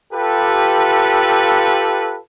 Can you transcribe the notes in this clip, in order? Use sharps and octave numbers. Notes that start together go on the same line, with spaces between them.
F4 G4 A4 B4